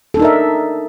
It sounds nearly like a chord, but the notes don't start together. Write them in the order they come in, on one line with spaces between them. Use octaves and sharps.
A4 D4 D#4 A#4 E5